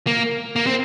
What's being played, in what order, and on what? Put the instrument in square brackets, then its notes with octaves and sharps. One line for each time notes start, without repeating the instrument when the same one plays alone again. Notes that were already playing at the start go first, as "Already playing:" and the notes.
[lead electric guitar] A#3
A#3
C4